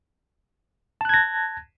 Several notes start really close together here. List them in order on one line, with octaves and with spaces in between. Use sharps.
A5 F#6 G#6 A#6